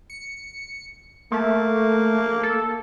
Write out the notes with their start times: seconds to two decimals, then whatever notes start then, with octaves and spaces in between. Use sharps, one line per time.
0.10 C#7
1.32 A3 A#3
2.43 A4